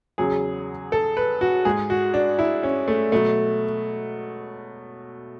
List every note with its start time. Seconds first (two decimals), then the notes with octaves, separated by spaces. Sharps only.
0.18 E2 C#3 F#3 G#4
0.92 A4
1.17 B4
1.41 F#4
1.65 G#2 G#3 G#4
1.90 F#4
2.14 D4
2.39 E4
2.63 C#4
2.88 A3
3.12 B2 F#3 A3